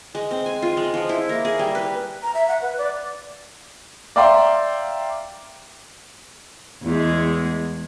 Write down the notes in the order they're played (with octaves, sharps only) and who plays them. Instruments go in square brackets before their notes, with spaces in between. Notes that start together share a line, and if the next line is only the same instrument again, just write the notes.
[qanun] G#3
C4
G#5
F4
G#3
F3
E4
A#3
G#4
G3
B4
[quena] A#5
E5
F#5
B4
D5
[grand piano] D5 E5 F5 G5 A#5 C6
[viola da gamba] E2 G#3